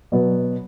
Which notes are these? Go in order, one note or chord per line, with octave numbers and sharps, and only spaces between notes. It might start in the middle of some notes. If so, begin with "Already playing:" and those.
B2 F#3 B3